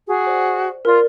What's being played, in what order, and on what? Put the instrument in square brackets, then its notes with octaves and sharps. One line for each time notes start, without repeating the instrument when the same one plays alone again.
[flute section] F#4 G#4
[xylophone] C5 D5
[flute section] F4 [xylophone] A#4 D5